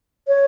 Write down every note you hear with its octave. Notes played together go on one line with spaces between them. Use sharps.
C#5